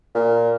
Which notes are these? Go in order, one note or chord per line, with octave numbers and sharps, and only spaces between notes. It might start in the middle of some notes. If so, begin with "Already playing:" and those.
A#2